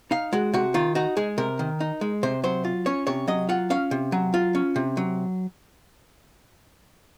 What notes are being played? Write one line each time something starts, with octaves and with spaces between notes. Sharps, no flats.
D#4 F5
G#3 F#4
C3 F#4
D#3 F4
D#4 F#4
G#3 G#4
C3 A#4
D#3
D#4
G#3
C3 C5
F#3 C5
F4
C#4 C#5
C3 C#5
F#3 D#5
F4 F#5
C#4 F5
C3
F#3
F4
C#4
C3
F#3